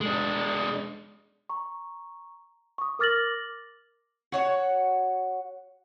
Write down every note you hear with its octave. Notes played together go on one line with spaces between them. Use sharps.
G#3 D4
A#5 C#6
C#6 D#6
A#4 D6 F6 A6 A#6 F#7
F#4 C#5 F#5